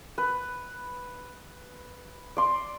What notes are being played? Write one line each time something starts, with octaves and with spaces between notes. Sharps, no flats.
B4
D5 C6